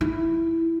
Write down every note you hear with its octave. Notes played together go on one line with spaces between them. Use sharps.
E4